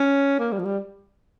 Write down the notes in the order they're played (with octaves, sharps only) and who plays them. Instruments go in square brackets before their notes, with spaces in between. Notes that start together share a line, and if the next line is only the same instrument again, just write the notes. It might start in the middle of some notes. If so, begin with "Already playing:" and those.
Already playing: [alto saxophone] C#4
A#3
G3
F3
G3